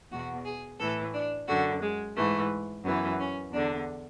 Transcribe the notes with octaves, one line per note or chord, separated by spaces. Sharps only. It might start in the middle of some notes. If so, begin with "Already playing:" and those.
E2 B2 F#4
G#4
A2 E3 A4
D4
F#2 D3 F#4
G#3
G#2 E3 A3
F#2 E3 B3
C#4
E2 D3 D4